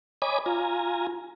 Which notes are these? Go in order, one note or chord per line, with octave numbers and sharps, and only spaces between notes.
C#5 D#5 G#5 B5 D6
F4 G#5 A#5